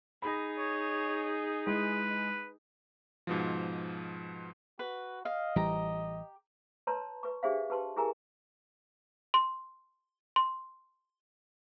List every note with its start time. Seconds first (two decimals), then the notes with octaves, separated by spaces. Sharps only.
0.22 D#4 G#4 B5 A#6
0.58 C#5
1.67 G#3 E4 B4
3.27 G#2 B2 F3
4.79 F#4 B4
5.25 D#5 F5
5.56 A1 E3 G3 G4 A#5
6.87 B4 C#5 A5 A#5 C6
7.23 B4 C#6
7.43 D4 G4 G#4 C5 E5 F5
7.70 G4 B4 A5 C6
7.96 E4 G4 G#4 A#4 G#5 A#5
9.34 C6
10.36 C6